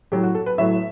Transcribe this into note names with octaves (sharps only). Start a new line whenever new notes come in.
A2 F#3 A3 G4
F#4
A4
B4
A2 F#3 A3 E5